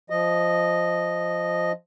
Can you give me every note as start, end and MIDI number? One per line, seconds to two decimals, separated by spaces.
0.10 1.72 53
0.10 1.72 75